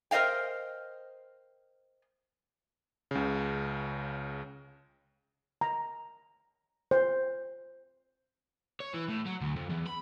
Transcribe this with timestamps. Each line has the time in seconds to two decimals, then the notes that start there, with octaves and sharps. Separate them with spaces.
0.11 A#4 C5 D#5 F5 G5
3.11 C#2 C#3
5.61 A#5
6.91 C5
8.80 C#5
8.94 E3
9.09 A2
9.26 F#3
9.41 D2
9.56 F2
9.69 E2
9.86 B5